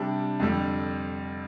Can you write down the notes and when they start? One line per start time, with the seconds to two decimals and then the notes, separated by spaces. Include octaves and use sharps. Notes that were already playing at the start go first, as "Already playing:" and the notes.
Already playing: C3 G3 D4
0.40 F2 D3 G3